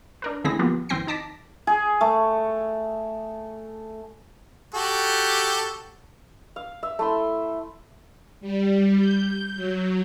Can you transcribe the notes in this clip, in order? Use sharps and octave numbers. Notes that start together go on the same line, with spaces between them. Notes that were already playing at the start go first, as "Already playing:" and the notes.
D4 A#4 B4
D2 D3 C4 E4 G#4 A#6
F3 A#3 B3 F4 G4
G1 E3 C4 G5 A#6 C7
D#4 A5 D6 A#6 B6
G#4
A3
F#4 G4 A4
F5
E5
A3 E4 C6
G3
G6
F#3